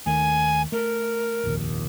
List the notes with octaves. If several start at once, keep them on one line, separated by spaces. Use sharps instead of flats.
D#2 D#3 A3 G#5
A3 A#4
F1 A#1 D#2